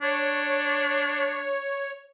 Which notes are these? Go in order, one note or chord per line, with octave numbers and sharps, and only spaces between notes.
D4 C#5